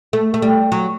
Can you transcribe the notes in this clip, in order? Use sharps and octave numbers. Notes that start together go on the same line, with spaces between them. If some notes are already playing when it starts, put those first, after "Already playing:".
A3
A3
G3
F#3